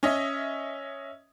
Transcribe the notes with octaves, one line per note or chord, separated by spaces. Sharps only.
C#4 D#5 E5